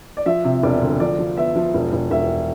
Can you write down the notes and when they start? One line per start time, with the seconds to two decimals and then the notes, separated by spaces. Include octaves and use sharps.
0.17 D5
0.26 F3 E5
0.44 C3
0.63 E1 D5
0.82 D2
1.00 F3 D5
1.19 F3
1.37 B3 E5
1.56 F3
1.74 E1
1.93 E1
2.11 E1 E5